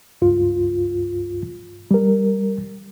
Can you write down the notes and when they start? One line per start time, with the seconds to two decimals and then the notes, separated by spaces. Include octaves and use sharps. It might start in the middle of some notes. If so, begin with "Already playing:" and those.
0.22 C#2 G2 F4
1.91 G3 A#4